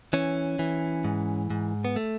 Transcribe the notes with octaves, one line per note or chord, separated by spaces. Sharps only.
E3 C#4
E3
G#2
G#2
B3
A3